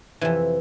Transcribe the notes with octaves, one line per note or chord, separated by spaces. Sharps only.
F2 C3 E3